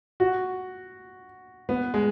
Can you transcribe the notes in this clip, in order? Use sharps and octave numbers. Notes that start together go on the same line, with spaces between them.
F#4
B3
G#3